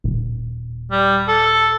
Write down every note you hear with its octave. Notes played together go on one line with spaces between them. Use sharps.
D#1
G3
A4